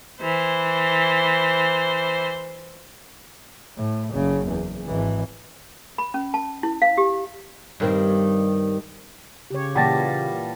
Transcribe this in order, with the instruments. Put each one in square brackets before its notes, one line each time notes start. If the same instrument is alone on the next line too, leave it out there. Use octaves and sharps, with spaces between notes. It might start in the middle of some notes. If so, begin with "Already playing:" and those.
[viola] E3 C5
[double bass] A2
F#1 C#3
E2
G#1 E3
[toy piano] B5
C#4
A5
E4
F5
G4
[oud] G2 D#3 C4
[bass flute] C#3 [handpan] G4 C#5
[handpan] A#2 E3 A#3 [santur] G3 A5 [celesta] F#5 G5 A#6